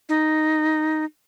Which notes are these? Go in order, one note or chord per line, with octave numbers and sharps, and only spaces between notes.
D#4